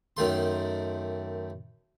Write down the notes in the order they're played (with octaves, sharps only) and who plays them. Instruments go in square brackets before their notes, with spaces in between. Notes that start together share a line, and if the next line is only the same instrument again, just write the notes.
[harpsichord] F#2 D#3 A3 C6